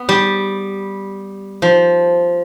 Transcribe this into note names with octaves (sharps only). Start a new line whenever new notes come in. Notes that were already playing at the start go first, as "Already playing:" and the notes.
Already playing: B3
G3
F3